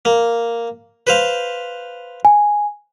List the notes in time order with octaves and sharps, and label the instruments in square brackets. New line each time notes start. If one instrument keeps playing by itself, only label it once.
[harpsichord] A#3
B4 C5 F5
[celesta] G#5